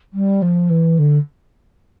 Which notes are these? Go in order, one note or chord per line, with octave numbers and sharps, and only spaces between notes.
G3
F3
E3
D3